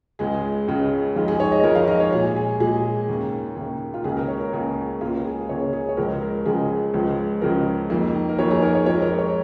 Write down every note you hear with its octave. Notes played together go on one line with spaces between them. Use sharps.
C#2 C#3 G#3 G#4
C#2 C#3 G#3
F2 D#3 G#3 F4
G#4
C#5
D#5
F2 D#3 G#3 A#4
F5
D#5
C#5
A#2 G#3 G#4
G#4
A#2 G#3 G#4
D#2 C#3 A#3
D#2 C#3 A#3
F4
C#2 C#3 A#3 G#4
A#4
C#5
A#4
C#2 C#3 A#3 G#4
C#2 C#3 A#3 F4
G#4
C#2 C#3 A#3 C#5
G#4
C#5
C#2 C#3 F3 G#3 A#4
A#4
C#2 C#3 F3 G#3 G#4
C#2 C#3 F3 G#3
C#2 C#3 F3 G#3 A#4
F2 D#3 A#3
A#4
F2 D#3 A#3 C#5
G#4
A#4
C#5
F2 F3 G#3 C#5
A#4
C#5